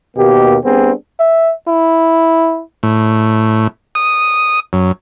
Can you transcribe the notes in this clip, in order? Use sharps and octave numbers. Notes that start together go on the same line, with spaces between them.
D#2 B2 A#3 G4
G3 B3 C4 D4 G#4
E5
E4
A2
D#6
F#2